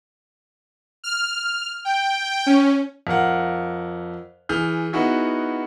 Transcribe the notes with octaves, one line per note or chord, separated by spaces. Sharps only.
F6
G5
C#4
F2 A#4 F5 F#5
E3 G#4 F6 G6
B3 D#4 E4 F#4 G#4